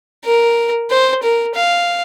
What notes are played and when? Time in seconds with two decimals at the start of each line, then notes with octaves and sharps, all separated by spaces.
0.25 A#4
0.91 C5
1.23 A#4
1.55 F5